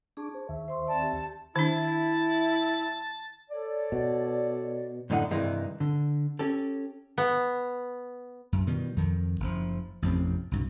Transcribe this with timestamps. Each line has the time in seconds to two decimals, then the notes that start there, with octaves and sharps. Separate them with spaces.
0.17 D4 G#4 A5 C#6 D6
0.34 C5
0.49 D#2 D#3 E5
0.68 C5 C6 C#6
0.87 C4 D5 A5
1.02 G4
1.56 D#3 D4 E4 A5
3.50 A4 C#5 D5
3.92 B2
5.10 F#2 A2 D3 D#4 F#5
5.31 G2 C3 D#3 E3 G#3
5.80 D3
6.39 C#4 G4 A4
7.18 B3
8.52 F#2
8.67 B2 D#3 E3 G3
8.96 F2 D#3
9.40 F#1 F3
10.02 A1 F2 C3 C4
10.51 C2 G2 B2